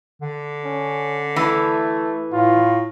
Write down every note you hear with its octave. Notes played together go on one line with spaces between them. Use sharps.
D3
C#4
E3 A3
A2 F4